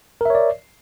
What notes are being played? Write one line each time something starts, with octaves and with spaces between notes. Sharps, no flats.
A#4 C#5 D5 E5